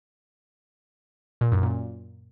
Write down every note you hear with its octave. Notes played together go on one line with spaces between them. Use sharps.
A#2
F#2
A#2